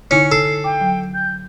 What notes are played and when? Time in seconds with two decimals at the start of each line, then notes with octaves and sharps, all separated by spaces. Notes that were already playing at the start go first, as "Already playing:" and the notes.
0.11 D3 C#4 D#4 E4 C#7
0.31 A4 C7
0.64 G5 D6
0.81 F#3
1.14 G6